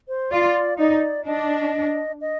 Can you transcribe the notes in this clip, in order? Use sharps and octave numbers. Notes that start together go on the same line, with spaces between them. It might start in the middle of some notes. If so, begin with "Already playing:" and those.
C5
F4 D5
D#4 D5
D4 D#5
D#5